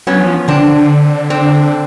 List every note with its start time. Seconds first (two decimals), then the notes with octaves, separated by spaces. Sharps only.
0.07 F#3 B3 C#4
0.21 F3
0.48 D3 C4 D4
0.62 D3
0.76 D3
1.30 C4 D4